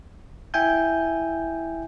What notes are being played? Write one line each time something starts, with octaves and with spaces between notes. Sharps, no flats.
E4 E5 G5 G#5 G6